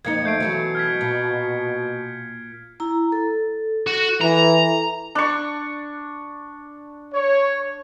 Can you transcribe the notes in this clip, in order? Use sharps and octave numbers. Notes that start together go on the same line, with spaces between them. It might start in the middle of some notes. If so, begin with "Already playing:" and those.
F2 A#3 D#4 G#6 C#7
A3 G6 C7 D7
B2 E3 F#3 A3
F6 G#6 B6
A#2
E4 A#5
A4
F#4
E3 A#5
D4 C#6
C#5